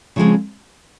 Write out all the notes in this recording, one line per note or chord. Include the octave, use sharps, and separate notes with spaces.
C#3 F3 G#3 C4 C#5